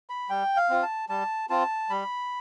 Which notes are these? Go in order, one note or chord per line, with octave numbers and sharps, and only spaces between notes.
B5
G3 G5
F5
C4 F4
A5
G3 A5
C4 F4 A5
G3 B5